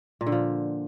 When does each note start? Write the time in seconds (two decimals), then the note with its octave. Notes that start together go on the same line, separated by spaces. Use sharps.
0.21 A#2
0.26 D3
0.32 F3